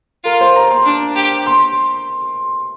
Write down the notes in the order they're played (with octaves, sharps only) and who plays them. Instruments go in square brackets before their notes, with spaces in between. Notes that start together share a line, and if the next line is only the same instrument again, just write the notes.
[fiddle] F4 [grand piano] A#4
[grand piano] C5
A#5
C6
[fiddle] D4
G4
[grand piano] C6